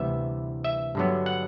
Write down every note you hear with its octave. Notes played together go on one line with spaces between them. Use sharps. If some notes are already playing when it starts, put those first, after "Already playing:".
Already playing: D2 C3 E3 G3 B3 E5
E5
G2 D3 F#3 B3
F#5